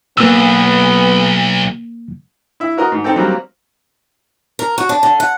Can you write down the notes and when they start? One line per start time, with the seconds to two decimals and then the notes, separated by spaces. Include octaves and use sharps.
0.17 B1 A#3 B3 E6
2.60 E4 E5
2.78 F#4 A#4 D#5
2.92 G#2
3.04 C4 D#4 A4 G5
3.16 F#3 G3 A#3 C4
4.59 A#4
4.78 F#4
4.89 D4
5.03 D3
5.20 F#5